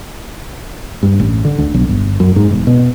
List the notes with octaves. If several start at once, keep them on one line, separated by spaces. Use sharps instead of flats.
G2
A1
D3
D2
B1
G1
F#2
G#2
E1
B2